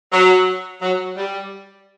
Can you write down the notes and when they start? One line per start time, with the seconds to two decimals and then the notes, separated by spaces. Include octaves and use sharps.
0.12 F#3
0.82 F#3
1.17 G3